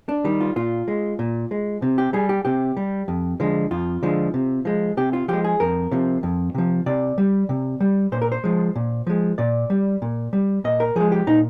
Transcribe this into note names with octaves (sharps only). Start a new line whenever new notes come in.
D4
D#3 G3
F4
A#2 F4
G#3
A#2
G#3
C3
G4
G3 G#4
G4
C3 G4
G3
F2
D3 F3 G#3
F2 F4
D3 F3 G#3
C3
F3 G#3
C3 G4
F4
F3 G#3 G4
G#4
F2 A#4
C3 F3
F2
C3 F3
C3 D5
G3
C3
G3
A#2 C5
A#4
C5
F3 G#3
A#2
F3 G#3
A#2 D5
G3
A#2
G3
A#2 D#5
A#4
F3 G#3 G#4
G4
A#2 D#4